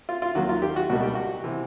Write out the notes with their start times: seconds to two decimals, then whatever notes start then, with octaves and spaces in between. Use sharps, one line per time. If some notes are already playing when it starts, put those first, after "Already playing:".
0.09 F4
0.22 F4
0.35 D#2 D#3 F#3 F#4
0.49 F4
0.62 G4
0.76 F#4
0.89 C#2 B2 G3 A#3 D#4 F#4
1.03 G4
1.15 F#4
1.44 C3 E3